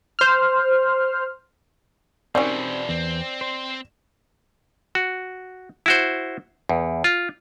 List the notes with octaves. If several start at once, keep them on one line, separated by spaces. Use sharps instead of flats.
C5 F6
E2 B2 D#3 G3 C4 C#4 D5
E2 C4
C5
F#4
E4 F#4 C5
E2
F4